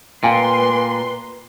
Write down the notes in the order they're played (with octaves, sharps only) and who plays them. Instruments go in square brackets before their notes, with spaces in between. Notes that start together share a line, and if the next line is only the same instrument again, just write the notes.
[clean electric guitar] A#2 [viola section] B4 C6 [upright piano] F5 G5 G#5